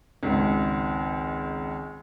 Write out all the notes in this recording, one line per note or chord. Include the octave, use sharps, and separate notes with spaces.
G#1 C#2